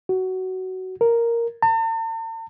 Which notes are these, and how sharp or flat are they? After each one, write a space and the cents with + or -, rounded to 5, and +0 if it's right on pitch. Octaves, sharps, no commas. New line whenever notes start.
F#4 +15
A#4 +0
A5 +45